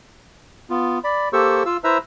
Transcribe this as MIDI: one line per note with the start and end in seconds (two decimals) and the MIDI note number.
0.70 0.99 59
0.70 0.99 65
1.04 1.29 74
1.04 1.29 83
1.33 1.63 58
1.33 1.63 67
1.33 1.63 69
1.33 1.63 72
1.33 1.63 85
1.33 1.63 88
1.66 1.77 65
1.66 1.77 77
1.66 1.77 88
1.84 1.98 64
1.84 1.98 71
1.84 1.98 72
1.84 1.98 76
1.84 1.98 82
1.84 1.98 88